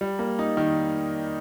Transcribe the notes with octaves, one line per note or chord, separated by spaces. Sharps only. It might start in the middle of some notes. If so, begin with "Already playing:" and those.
G3
A#3
D#4
D#3